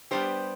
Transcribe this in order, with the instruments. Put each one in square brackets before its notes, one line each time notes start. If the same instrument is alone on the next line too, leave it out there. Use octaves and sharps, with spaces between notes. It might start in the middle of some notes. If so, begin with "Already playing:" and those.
[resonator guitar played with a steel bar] G3 B3 D4 G4 C5